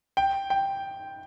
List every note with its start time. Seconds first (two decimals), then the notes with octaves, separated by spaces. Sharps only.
0.17 G5
0.50 G5